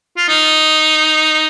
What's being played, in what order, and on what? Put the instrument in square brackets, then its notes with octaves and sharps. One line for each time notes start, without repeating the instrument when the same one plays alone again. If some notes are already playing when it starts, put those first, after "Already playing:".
[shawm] F4
D#4